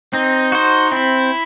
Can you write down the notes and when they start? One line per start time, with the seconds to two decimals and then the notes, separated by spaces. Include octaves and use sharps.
0.13 C4 D#4
0.52 F#4 C5
0.91 C4 E4